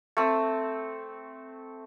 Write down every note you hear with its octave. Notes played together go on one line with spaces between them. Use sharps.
A3 C4